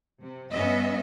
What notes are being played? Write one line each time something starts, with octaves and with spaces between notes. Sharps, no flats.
C3
G2 B3 C#4 D#5 E5